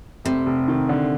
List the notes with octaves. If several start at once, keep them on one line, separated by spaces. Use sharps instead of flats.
F1 C3
F1
D#3
D3